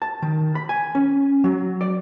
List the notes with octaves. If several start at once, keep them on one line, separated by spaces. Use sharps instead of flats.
A5
D#3
B5
G#5
C#4
F#3
D5